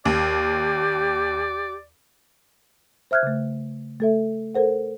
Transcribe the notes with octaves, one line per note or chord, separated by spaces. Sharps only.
D#2 G4 D5
C5 E5 F6 F#6 G#6
C#3 A3
A3 A4 E5
A4 A#4 C5 F#5